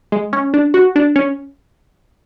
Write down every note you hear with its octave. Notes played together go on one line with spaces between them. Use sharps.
G#3
C#4
D4
F#4
D4
C#4